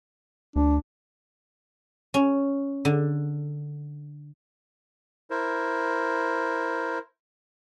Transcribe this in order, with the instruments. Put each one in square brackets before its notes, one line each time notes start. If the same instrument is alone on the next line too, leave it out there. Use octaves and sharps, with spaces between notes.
[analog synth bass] D2 [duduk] D4
[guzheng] C#4
D3
[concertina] E4 A#4 C5